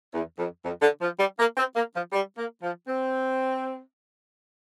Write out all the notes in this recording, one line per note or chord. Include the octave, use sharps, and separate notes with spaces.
E2
F2
F2
D3
F3
G3
A#3
C4
A#3
F3
G3
A#3
F3
C4